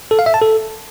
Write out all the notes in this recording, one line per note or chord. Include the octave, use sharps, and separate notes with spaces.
A4
F5
E5
A5
A4